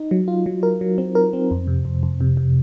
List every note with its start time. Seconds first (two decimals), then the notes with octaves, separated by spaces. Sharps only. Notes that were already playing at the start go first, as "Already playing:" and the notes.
Already playing: D#4
0.11 F#3
0.28 F4
0.46 F#3
0.63 A#4
0.81 F#3
0.98 C4
1.15 A#4
1.33 C4
1.51 F2
1.67 C3
1.85 F2
2.03 F2
2.21 C3
2.37 C3